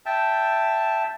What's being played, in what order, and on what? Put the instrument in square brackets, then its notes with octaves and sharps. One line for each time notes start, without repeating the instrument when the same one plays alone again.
[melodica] E5 G5 A5